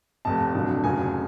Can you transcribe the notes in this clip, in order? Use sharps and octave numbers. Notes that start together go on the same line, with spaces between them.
F1 F2 C3 A5
F1 F2 D3 F#3
F1 F2 C#3 F#3 G#5